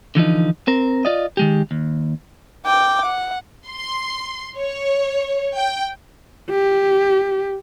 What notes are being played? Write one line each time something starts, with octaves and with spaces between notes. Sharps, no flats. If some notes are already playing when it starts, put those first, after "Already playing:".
D3 E3 F3 D#4
C4 A#4
F4 D5 D#5
D#3 G#3 G4
D#2
G5 D6
F#5
C6
C#5
G5
G4